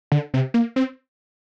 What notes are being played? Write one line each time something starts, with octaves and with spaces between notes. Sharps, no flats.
D3
C3
A#3
C4